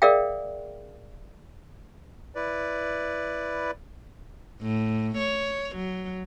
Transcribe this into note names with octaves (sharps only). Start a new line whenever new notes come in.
G#4 A#4 D5 E5 F5 G5
E4 B4 D5
A2
C#5
F#3